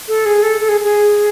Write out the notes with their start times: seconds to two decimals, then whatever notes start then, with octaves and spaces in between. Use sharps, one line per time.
0.08 A4
0.25 G#4
0.43 A4
0.61 A4
0.69 G#4
0.84 G#4